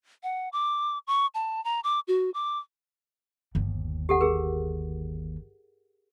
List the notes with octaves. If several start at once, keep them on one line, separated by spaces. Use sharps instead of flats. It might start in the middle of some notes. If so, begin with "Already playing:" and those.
F#5
D6
C#6
A5
A#5
D6
F#4
D6
G1 D#2
G4 A4 F#5
G#4 A#4